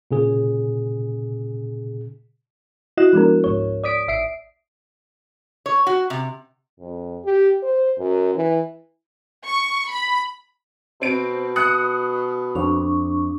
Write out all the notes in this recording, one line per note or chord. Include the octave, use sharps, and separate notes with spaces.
A#2 C#3 G#4
E4 F#4 D#5 F#6 E7
F3 G#3 B3 D4 A#4
C#2 G#2 C#5
D5 D#6 B6 D7
A1 E5 C7 D7
C#5
F#4
C3
F2
G4
C5
F#2
E3
C#6
B5
B2 C4 D7
D#6 F#6 C#7
F2 D4 C#6